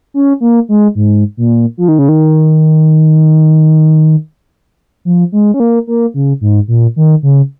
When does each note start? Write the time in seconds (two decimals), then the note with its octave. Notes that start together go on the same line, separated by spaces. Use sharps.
0.14 C#4
0.41 A#3
0.69 G#3
0.95 G#2
1.37 A#2
1.78 F3
1.88 D#3
1.99 C#3
2.09 D#3
5.05 F3
5.32 G#3
5.54 C#4
5.60 A#3
5.87 A#3
6.14 C#3
6.41 G#2
6.68 A#2
6.96 D#3
7.23 C#3